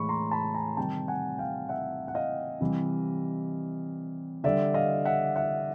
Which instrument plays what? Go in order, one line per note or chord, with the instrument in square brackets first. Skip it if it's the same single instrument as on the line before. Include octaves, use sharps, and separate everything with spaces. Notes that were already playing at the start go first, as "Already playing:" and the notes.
Already playing: [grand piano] A2 E3 G#3 B5 C#6
A#5 C6
A5 B5
G#5 A#5
C3 D#3 G3 G5 A5
F#5 G#5
F5 G5
E5 F#5
F#5
D#5 F5
C3 E3 G3
D3 G3 D5 E5
D#5 F5
E5 F#5
E5 F#5